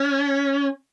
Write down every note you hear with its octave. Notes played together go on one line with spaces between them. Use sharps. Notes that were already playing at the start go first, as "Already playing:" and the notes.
Already playing: C#4